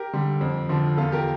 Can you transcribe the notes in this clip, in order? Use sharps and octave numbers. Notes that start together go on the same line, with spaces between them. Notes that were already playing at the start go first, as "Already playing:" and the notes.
Already playing: G4 A#4
D3 G3
F2
D3 F3
E2 F4 A4
G4 A#4